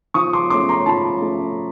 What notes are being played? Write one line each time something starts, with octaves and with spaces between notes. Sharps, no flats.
F3 C#6 D#6
C6 D6
A3 C#4 C6 D6
A#5 C6
F3 A5 B5
A3 C#4